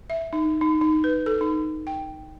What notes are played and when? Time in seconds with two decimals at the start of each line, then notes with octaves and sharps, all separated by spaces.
0.10 E5
0.33 D#4
0.61 D#4
0.81 D#4
1.04 B4
1.26 A4
1.41 D#4
1.87 G5